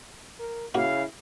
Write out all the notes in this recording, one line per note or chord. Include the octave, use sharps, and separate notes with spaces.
A#4
C#3 A#3 E4 F#4 F5